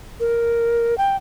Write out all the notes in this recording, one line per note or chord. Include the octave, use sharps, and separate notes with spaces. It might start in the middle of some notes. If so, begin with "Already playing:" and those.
A#4
G5